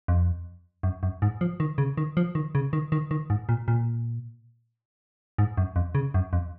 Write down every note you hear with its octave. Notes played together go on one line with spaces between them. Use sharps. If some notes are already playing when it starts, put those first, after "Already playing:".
F2
F#2
F#2
G#2
F3
D#3
C#3
D#3
F3
D#3
C#3
D#3
D#3
D#3
G#2
A#2
A#2
G#2
F#2
F2
C#3
F#2
F2